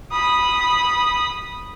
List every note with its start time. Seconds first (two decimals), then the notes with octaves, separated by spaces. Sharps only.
0.12 B5 D#6